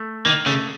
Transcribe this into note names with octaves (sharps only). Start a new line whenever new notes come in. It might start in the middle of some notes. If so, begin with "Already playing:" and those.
Already playing: A3
D#3 A#3
C#3 A3